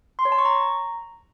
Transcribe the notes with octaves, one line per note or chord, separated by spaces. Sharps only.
C6
C#5
A5
C#6
A#5